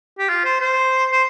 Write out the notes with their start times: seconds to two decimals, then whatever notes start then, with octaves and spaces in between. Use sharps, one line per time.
0.19 G4
0.29 F4
0.45 C5
0.60 C5
1.12 C5